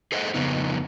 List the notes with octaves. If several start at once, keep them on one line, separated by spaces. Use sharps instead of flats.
G#4 A4 C5 D#5 E5 F#5
F2 C#3 B3 D#4